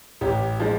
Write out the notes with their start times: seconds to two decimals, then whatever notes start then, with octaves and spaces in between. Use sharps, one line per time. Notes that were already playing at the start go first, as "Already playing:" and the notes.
0.21 A1 G4
0.60 F3 G#3